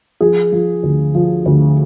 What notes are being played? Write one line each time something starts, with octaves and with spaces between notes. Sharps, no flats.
F3 G#4
F3
D2
F3
D2